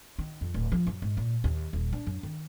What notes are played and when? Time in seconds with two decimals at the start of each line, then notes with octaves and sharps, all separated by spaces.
0.19 D#3
0.41 F2
0.54 D1
0.72 F3
0.87 F#2
1.02 G#2
1.17 A#2
1.44 D#2
1.73 D#1
1.93 D4
2.07 F#2
2.23 D#3